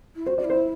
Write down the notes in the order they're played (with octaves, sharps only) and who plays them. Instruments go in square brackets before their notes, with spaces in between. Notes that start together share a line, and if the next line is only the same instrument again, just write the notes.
[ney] E4
[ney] F#4 [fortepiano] C5
[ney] F#4 [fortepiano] D5
[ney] E4
[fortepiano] C5